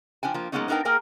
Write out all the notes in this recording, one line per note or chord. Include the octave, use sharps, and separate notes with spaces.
F3 D4 G5 G#5
F3 A#3
F#3 G#3 A#3 B3 C#4 D#4
B3 D4 D#4 A#4 G5
A#3 G#4 A#4 G5 G#5